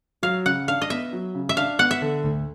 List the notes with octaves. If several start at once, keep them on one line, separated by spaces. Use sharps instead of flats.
F#3 F5
C#3 F#5
D4 F5
D#5
B3 E5
F#3
C#3
E5
D4 F5
B3 F#5
E5
D3
D2